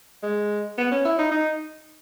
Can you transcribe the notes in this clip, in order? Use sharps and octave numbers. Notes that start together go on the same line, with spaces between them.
G#3
B3
C#4
E4
D#4
D#4